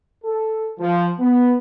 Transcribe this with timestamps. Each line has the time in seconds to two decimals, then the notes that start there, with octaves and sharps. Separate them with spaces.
0.24 A4
0.79 F3
1.19 B3